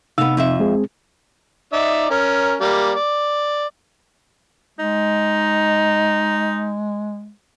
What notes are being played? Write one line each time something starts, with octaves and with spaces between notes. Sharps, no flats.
C3 B3 D#4 F5 E6
F2 F4 E5
G#3 C4 G#4
D#4 D5 E5
C#4 A#4
G3 A#3 D5
D5
G#3 D#4